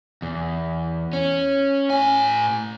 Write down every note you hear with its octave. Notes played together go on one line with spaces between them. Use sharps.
E2
C#4
A2 G#5